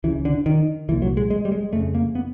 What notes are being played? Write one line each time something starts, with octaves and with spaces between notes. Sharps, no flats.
C#2 C#3 E3
D3
D#3
C2 A#2 E3
F#3
G#3
G#3
G3
G#3
F2 C#3 A3
A#3
B3